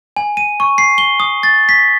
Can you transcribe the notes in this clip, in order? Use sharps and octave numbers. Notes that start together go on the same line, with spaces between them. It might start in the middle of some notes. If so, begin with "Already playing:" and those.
G#5
D#7
C#6
C7
G7
D#6
A6
B6